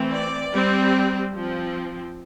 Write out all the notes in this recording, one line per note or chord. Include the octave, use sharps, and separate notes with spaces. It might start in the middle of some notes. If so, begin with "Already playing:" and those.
Already playing: E3 A3 C4
D5
G3 C4
F3 C4